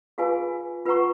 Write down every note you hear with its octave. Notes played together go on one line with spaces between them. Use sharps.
F4 G#4 B4 F5 G#5
F4 B4 F#5 A#5 C#6